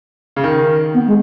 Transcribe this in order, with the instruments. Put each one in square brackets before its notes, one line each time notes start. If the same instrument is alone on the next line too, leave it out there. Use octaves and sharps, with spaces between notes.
[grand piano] C#3
D#3
[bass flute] B3
G#3